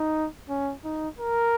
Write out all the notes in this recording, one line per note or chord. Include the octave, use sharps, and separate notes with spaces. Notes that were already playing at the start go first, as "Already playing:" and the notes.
Already playing: D#4
C#4
D#4
A#4